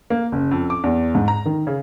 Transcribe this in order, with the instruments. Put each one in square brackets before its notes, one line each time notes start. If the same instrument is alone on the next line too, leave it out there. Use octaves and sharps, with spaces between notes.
[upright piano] A#3
F#1
F2
D6
E2
G#2
A#5
D#3
C#3